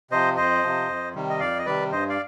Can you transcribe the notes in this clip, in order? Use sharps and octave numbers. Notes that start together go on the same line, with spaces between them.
C3 F3 C5 D#5
F2 C5 D#5
C3 F3
F2
C3 D#3 G3
D#5
F2 D5 F5
D#5
C3 D#3 G3 B4 D5
G2 C5 D#5
D5 F5